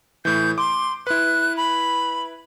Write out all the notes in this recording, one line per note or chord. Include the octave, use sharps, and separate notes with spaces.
A2 E3 G6
C6 D6
E4 B4 F#6
B5